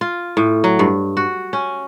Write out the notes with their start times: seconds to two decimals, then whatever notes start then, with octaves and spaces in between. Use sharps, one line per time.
0.01 F4
0.37 A2
0.64 F#3
0.79 G2
1.17 F#4
1.53 C#4